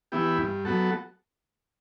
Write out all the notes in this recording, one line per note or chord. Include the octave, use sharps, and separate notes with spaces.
E3 B3 E4 G4
G2
F#3 B3 F#4 A4